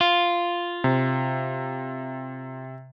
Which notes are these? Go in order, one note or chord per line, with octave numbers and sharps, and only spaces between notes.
F4
C3